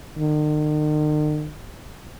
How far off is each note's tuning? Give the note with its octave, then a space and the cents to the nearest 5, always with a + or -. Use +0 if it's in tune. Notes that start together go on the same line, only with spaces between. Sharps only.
D#3 -45